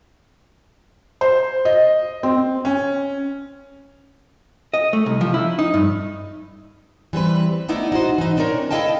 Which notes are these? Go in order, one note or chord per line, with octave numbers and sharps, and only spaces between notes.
C5
D#5
C4
C#4
D#5
A3
C2
F3
E4
D#4
G2
E3 G3 C4 B4
A3 B3 D#4 E4 D5
D#4 F#4 C5
E3 D#4
C4 D4 D#4 A#4 C#5
E4 A4 D#5 F5 G5 A5